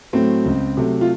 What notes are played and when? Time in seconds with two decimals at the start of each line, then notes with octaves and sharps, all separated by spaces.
0.13 A2 F#3 A3 C4
0.45 C#2
0.77 C3 F#3 A3
1.01 F4